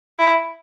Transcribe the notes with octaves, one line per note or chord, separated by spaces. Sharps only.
E4